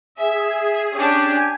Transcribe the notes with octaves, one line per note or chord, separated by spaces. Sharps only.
G#4 E5
C#4 D4 G4
G#5